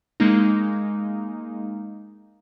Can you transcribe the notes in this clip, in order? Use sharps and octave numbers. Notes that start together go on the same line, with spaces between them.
G#3 A#3 D#4